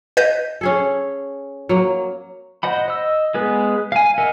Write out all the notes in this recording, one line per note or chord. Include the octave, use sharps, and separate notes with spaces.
B4 D#5 G6
C#4 G#4 A4
F#3 A#3
C5 D#5 F#5 B5
D#5 E6
G#3 B3 G#4 B4
F5 G#5
A#4 D#5 E5 F#5 G#5